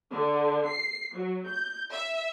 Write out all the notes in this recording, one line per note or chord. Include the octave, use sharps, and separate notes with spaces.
D3
C7
F#3
G6
E5